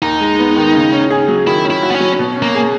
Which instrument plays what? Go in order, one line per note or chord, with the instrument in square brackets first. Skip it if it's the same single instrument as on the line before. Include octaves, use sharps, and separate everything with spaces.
[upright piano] D#2 [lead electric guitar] D#4
[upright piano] G#3
B3
D#3
C#3
C#4
G#4
F#3
[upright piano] D#3 [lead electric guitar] E4
[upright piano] C#4
[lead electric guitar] E4
[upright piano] F#4
[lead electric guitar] B3
C#4
[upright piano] F#3
B2
C#4
[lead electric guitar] A#3
[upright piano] G#4